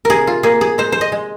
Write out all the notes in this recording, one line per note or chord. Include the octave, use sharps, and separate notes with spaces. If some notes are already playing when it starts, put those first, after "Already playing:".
C3 G#4 A#4
F4
A#3 G#4
G#4
G#3 C5
C5
D#5
G#3